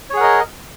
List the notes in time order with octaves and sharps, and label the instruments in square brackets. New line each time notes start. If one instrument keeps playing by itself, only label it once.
[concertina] C#5
G#4
F#5
A#4
D#5